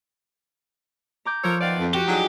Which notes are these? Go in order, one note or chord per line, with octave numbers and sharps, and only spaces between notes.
A#5 D6 G6
F3 A4 A#4 C#5
D#3 B3 D5 F5
F2
F#4 G4
F#3 D4 D#4 F#4 G#4